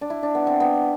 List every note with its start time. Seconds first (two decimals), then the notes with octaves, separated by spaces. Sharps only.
0.01 D4
0.10 E4
0.23 D4
0.35 B3
0.47 C4
0.60 B3